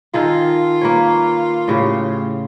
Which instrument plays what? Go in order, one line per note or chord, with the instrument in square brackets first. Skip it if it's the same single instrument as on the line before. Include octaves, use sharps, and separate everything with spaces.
[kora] D#3 G#4 A4 [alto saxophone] F4
[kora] A#3 B4 C#5
A2 C#3 G4